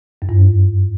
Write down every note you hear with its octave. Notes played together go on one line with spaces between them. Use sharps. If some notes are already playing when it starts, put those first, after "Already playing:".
F#2
G2